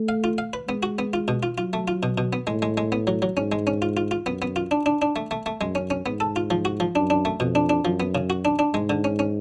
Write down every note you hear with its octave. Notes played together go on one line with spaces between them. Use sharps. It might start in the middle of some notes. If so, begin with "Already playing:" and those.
Already playing: A3
F5
F4
F5
B4
G#3 B3
F#4
B3
F4
B2
F4
F#3 F4
A3
F4
B2
B2
B3
A2 G#3
G#3
G#3
B3
F#3
F#3
G#2 C#4
G#3
C#4
F4
F4
F4
F#2 B3
B3
F4
D4
D4
D4
A3
A3
A3
F#2 G#3
C#4
C#4
G#2 B3
A4
F4
F3
F#4
F3
F#2 D4
D4
A3
F2 B2
D4
D4
F#2 F3
B3
C#3
F#4
D4
D4
G#2 G#3
D3
C#4
C#4